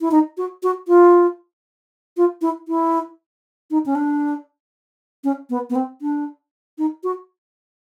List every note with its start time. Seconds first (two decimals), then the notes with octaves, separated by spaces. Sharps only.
0.01 E4
0.11 D#4
0.37 F#4
0.63 F#4
0.88 F4
2.17 F4
2.42 E4
2.68 E4
3.71 D#4
3.86 C#4
3.95 D4
5.24 C#4
5.50 B3
5.70 B3
5.75 C4
6.02 D4
6.78 D#4
7.04 F#4